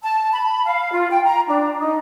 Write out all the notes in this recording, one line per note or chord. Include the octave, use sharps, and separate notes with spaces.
A5
B5
F5
F4
G5
A#5
D4
D#4